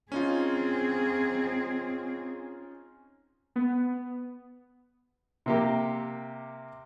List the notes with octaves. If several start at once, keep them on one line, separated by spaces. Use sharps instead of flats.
C4 C#4 D#4 F4 G#4
B3
C3 A#3 G4